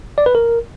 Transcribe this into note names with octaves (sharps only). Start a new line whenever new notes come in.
D5
B4
A#4